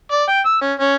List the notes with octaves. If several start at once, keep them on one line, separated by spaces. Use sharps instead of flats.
D5
G5
E6
C#4
C#4